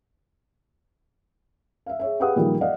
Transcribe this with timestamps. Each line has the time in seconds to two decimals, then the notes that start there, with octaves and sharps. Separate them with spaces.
1.86 E5 F5
1.99 G#4 C#5 E5
2.20 G4 G#4 B4 F5 F#5 D#6
2.36 A#2 D#3 F3 G3 A#3
2.61 D5 D#5 F5 F#5